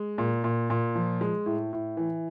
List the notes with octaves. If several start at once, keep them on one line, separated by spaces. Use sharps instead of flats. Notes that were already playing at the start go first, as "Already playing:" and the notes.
Already playing: G#3
A#2
A#2
A#2
F3
G#3
A2
A2
E3